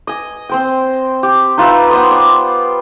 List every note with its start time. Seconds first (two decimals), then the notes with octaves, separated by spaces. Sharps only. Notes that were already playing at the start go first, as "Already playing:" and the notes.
0.07 D#5 G#5
0.49 C4 C5 G5
1.23 G4
1.57 D#4 F4 B4 E5
1.90 B3 C5 D#6
2.11 D5